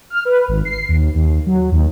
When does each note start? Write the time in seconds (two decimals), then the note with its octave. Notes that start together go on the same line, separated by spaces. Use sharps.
0.10 F6
0.25 B4
0.48 G#1
0.65 C7
0.88 D#2
1.15 D#2
1.46 F#3
1.72 D#2